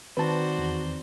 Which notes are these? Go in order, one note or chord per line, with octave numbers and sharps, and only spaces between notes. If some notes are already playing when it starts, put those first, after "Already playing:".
D#3 C4 F#4 B4 C5 D5 A5
E2